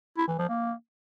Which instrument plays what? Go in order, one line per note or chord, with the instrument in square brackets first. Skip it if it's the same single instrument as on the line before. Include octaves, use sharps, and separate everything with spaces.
[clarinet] E4
E3
F3
A#3